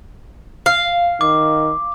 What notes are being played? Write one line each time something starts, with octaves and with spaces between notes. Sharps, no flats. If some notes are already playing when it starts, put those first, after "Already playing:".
F5
D#3 D6